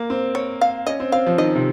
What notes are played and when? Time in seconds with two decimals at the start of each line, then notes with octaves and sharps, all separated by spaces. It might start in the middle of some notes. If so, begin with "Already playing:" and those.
Already playing: A#3
0.10 C4
0.35 C#5
0.61 F5
0.86 C#4 D#5
1.00 C4
1.12 C4 F5
1.26 F3
1.38 D#3 D#5
1.56 C3